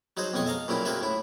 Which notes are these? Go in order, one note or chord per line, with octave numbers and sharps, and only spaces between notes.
F#3 D#4 F#4 G#4 C5
B1 F2 G#3 G#5 C#6 D#6
A4 D#5 F5 A#5
A#2 C#3 F#3 C4 E4
A#3 C4 F#4 G#4 A4 E5
A2 E4